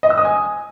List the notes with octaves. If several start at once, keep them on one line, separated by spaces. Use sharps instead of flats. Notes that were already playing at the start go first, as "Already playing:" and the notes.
D#5
E6
D#6
G#5